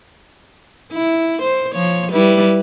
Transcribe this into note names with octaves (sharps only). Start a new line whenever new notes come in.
E4
C5
F3 C#5
G3 E4 B4